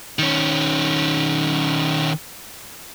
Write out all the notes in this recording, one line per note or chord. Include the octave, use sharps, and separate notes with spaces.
D#3 C#4